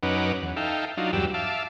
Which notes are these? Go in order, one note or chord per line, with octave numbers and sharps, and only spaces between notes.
F#2 C#4 D#4 B4 F#5 D6
E2
D#4 A4 E5 F5 G5
F#3 D4 D#4 F4
E2 G2 F#3 G4 D5 E6
E5 F5 A5 D6